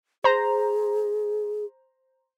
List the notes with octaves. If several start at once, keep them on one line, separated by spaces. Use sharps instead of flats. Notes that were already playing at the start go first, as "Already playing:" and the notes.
G#4 C5 A#5